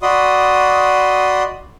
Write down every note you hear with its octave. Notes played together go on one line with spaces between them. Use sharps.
F#4 D5 D#5 B5 C6 D#6